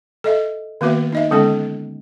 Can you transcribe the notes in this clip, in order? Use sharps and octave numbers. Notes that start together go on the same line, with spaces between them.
A4 D#5 E5
D#3 A#3 B3 F#4 B4 E5
D#4 D#5 E5
D3 G#3 B3 C#4 A4